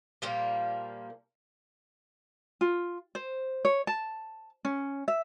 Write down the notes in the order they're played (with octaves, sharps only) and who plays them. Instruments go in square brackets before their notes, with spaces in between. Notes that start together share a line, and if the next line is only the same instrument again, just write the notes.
[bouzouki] A#2 F3 G3 A#3
[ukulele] F4
C5
C#5
A5
C#4
E5